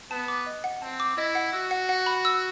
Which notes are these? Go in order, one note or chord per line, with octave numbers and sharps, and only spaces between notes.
B3 A5
D6
D#5
F#5
C4 A5
D6
E4 D#5
F#5
F#4 E6
F#5
F#5
B5
E6